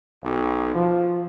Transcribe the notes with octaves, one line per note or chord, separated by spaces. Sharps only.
B1
F3